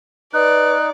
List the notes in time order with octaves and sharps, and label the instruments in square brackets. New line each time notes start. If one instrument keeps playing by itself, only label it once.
[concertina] D#4 [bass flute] B4 [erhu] D5 [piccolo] F#6